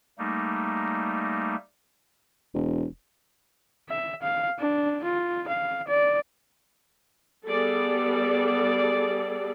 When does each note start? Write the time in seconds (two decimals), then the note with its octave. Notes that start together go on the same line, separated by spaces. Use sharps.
0.18 G3 A3 A#3 D#4
2.54 E1
3.90 E5
4.23 F5
4.59 D4
5.04 F4
5.48 F5
5.88 D5
7.46 G3 B3 G#4 A4 D5